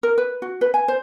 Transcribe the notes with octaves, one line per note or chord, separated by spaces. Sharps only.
A#4
B4
F#4
B4
G#5
C5